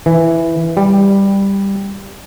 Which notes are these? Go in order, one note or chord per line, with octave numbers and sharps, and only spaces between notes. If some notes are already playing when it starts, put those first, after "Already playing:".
E3
G3